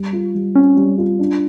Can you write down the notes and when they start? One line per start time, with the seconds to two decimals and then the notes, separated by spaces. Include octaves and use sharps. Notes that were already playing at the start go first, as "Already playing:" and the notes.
Already playing: G3
0.13 F4
0.34 G3
0.55 C4 C#4
0.77 G3
0.98 F4
1.19 D4